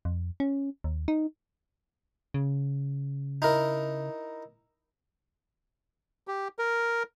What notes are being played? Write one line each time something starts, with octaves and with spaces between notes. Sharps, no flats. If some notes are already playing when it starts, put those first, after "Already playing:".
F2
C#4
D#2
D#4
C#3
D#4 E4 A#4
G4
A#4